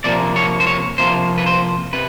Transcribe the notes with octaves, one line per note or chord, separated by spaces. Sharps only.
C3 F3 A#3 D5
C#5
C5
C#5
C3 F3 A#3 C5
B4
C5
C3 B4